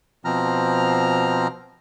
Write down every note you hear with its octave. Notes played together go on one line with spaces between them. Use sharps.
B2 F3 C4 A#5 F6